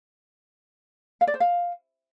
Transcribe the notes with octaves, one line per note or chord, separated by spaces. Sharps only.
F5
D5
C5
F5